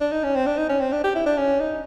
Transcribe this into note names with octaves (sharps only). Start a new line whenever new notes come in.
D4
D#4
C#4
C4
D4
D#4
C#4
C4
D4
G4
E4
D4
C#4
D#4